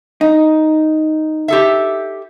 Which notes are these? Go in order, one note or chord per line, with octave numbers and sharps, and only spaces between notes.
D#4
G4 A4 E5